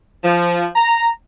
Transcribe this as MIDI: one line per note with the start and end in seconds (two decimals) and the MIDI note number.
0.24 0.66 53
0.76 1.09 82